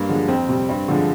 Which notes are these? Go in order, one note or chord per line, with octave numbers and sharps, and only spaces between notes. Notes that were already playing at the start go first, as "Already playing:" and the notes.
Already playing: G2 A#3
D3 F3 G#3
F2 C4
C3 G3
G2
D3 F3 G#3